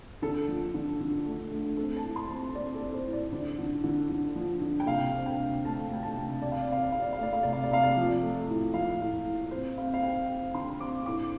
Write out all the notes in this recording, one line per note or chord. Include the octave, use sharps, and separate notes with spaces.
D3 A4
F3
D3
D3
A3
A3
C4 A4
A5
A2
C6
C4
A5
C4 D5
A4
C4
C5
A2
D5
D3
D3
D3
D3
F3
D3
G5
C3 F5
C4
G5
C3
A3 A5
A3 G5
A5
C3
C3 D5
F5
D5
C4
F5
D5
C4 F5
D5
F5
A3 D5
F5
C3 D5
F5
D5
C3 F5
D5
F3
A3
A2
F3 F5
A2
A2
C4 C5
C4 F5
F5
C4 G5
C4
D3 C6
C4 D6
A2 D6